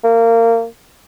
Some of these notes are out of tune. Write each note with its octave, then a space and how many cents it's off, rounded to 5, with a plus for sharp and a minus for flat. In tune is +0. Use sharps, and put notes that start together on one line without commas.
A#3 -25